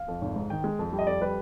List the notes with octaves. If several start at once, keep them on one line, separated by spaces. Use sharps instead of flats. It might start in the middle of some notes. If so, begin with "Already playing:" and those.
Already playing: F5
F2
G#1
G#2
D#3 G5
G#3
F2
G3
D#5
F2 D5
G3 B4